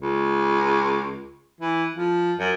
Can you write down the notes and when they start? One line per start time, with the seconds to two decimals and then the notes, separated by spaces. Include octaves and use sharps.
0.02 C#2
1.60 E3
1.96 F3
2.38 F#2